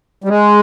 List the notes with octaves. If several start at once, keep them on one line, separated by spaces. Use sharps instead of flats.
G3
G#3